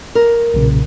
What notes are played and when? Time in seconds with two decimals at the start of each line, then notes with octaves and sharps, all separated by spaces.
0.15 A#4
0.54 B1 A#2 C#3